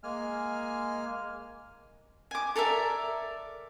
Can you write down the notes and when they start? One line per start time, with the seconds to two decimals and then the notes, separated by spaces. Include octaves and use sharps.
0.03 G#3 A#3 G#5 F6
2.31 G#5 D6
2.56 A4 A#4 D5 E5